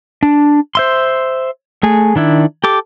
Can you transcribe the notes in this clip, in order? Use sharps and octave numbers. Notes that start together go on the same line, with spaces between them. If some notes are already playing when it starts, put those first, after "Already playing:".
D4
C5 E5 C6
A3 G#4
D#3 D4 E4
G4 A4 D6